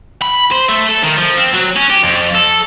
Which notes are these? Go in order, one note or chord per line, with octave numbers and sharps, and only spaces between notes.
B5
C5
A3
A4
D#3
F3
C4
F#3
C#4
G4
F2
A4